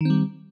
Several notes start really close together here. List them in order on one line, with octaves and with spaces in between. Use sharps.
D#3 C4 G3